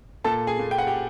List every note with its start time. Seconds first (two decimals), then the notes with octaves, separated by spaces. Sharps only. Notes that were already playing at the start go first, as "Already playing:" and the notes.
0.24 A#2 A4 A5
0.47 G#4 G#5
0.59 A#2
0.71 G5
0.78 F#5
0.87 G4 G5